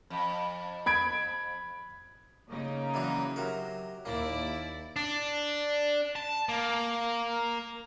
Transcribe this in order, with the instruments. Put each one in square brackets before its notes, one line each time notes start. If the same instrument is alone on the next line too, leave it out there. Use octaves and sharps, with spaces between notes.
[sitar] F2
[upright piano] B5 G#6 D7
[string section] C#3 A#3 D#4
[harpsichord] E3 F#3 D4
C3 F#3 A#4
[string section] D#2 E4 D5 [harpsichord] A#3
[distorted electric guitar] D4
A5
A#3